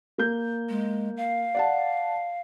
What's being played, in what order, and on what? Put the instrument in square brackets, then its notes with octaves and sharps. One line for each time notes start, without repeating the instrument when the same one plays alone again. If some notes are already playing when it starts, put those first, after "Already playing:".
[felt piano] A#3 G6
[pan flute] G#3
F5
[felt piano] D5 F#5 A5